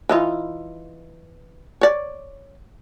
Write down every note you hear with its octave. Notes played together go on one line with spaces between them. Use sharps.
E3 D#4 F4
C#5 D5